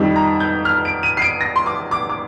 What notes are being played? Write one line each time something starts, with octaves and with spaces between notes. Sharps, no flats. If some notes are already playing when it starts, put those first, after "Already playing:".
Already playing: F2 D#3 G3
A#5
G6
F6
D7
D#7
C7
D7
A#6
C6
D6
D6
D6